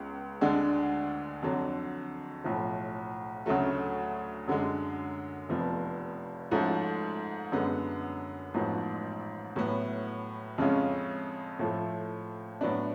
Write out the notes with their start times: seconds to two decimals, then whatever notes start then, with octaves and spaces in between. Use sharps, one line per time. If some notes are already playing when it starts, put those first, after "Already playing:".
Already playing: C#2 G#3 B3
0.41 D2 D3 G#3 D4
1.42 F2 D3 F#3
2.44 B1 A2 F3
3.46 D2 C#3 F#3 A3
4.48 F#2 D3 G#3
5.49 F1 F2 F3 B3
6.51 G#2 F3 A3 C#4 F#4
7.52 F#2 D3 G#3 B3
8.54 A1 G#2 F3 B3 F#4
9.56 A2 F#3 B3
10.58 F2 C#3 G#3 C#4 F4
11.59 A2 F3 A3
12.61 A2 F#3 B3 D4